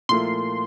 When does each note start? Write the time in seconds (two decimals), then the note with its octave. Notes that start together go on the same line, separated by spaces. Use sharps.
0.09 A#2 F3 A3 E4 A#4 C6